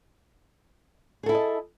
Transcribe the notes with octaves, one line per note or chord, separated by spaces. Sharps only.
E4 G#4 A4 D#5 A5